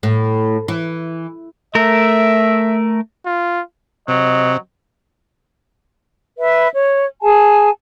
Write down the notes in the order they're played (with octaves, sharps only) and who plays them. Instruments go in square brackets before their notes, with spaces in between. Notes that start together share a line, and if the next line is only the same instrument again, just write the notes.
[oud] A2
E3
[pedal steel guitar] A3 A#4 [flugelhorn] E5
[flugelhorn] F4
[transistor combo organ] C3 [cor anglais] F#3 [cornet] D#5
[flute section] B4 E5
C#5
G#4 G#5 A5